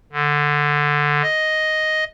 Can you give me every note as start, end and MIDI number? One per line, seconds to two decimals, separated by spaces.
0.12 1.22 50
1.23 2.04 75